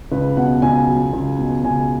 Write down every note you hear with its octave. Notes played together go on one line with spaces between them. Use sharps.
C#2 B4
B2 F#5
C#2 G#5
F#3
C#2
B2
C#2 G#5